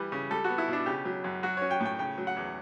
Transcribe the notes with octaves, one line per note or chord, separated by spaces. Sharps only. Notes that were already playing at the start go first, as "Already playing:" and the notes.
Already playing: E3 G3 B4
C#3
G3 A4
B3 F#4
E4
B2 D4
C#3 G4
F#3
F#2
F#3 F#4
C#4 C#5
G5
A2
G5
C#3 G5
F#3
F#5
E2